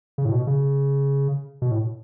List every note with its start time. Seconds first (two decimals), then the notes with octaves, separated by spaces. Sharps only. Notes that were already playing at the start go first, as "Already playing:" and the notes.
0.18 C#3
0.25 A2
0.32 B2
0.47 C#3
1.62 B2
1.71 A2